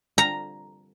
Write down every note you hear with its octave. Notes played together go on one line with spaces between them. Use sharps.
A#5